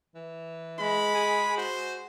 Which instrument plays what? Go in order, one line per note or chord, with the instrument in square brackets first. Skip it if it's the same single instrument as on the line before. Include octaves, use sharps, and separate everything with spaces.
[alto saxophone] E3
[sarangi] G#3 [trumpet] B5
[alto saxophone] G#4
[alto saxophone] F#4 [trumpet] C5